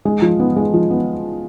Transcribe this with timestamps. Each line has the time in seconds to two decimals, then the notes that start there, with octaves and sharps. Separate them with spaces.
0.05 G#3
0.22 F3
0.40 B3
0.56 G#3
0.74 F3
0.91 B3